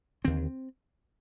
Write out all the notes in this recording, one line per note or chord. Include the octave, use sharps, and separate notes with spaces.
D#2 D3 C4